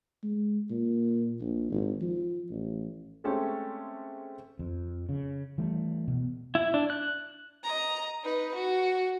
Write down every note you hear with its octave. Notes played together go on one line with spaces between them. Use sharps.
G#3
A#2
A#1
G#1
F3
A1
G#3 A3 C4 C#4 G4 A4
F2
C#3
E3 G3 A3
B2
E4
D4
F#6
D#5 A#5
D#4 B4
F#4